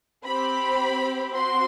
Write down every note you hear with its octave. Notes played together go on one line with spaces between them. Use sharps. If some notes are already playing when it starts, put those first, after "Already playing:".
C4 G4 B5
C4 F#4 C6